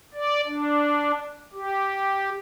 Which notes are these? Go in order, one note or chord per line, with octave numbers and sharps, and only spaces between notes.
D5
D4
G4